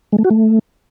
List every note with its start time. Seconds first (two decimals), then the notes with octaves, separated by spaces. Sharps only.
0.12 G#3
0.18 A3
0.24 F#4
0.30 A3